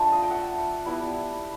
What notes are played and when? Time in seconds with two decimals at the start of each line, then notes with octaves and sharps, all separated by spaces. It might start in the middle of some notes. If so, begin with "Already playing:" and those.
Already playing: A3 D4 F4 A5 B5
0.12 D#5 F5
0.23 G5
0.30 E5 F#5
0.86 G3 B3 E4